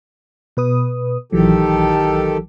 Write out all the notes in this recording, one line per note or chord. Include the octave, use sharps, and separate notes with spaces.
B2 B4 D#6
A#1 D#3 E3 F#3 G4 A4